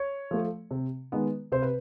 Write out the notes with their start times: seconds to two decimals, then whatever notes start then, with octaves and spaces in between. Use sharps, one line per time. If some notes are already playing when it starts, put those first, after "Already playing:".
Already playing: C#5
0.31 F3 A3
0.71 C3
1.12 D#3 G#3 B3
1.52 C3 C5
1.62 B4